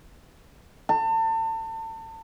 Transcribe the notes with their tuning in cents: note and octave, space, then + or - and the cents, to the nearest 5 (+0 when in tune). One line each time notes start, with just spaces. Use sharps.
A5 +35